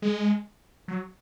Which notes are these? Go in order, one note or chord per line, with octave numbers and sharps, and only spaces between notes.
G#3
F#3